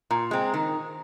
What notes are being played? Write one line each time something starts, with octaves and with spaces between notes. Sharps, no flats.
A#2
G#3 C4
D#3